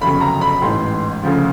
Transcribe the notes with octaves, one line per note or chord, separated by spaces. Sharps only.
G1 F2 C#3 F#3 B5
A#5
B5
A1 G#2 E3 C6
D2 C#3 F3